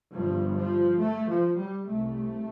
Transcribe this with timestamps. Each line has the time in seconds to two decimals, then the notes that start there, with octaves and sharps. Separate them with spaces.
0.13 G1 G2 F3
0.56 F3
1.00 A3
1.29 F3
1.58 G3
1.87 C2 C3 A3